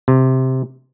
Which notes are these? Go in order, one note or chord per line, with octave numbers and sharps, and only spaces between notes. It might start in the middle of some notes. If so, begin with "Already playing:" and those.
C3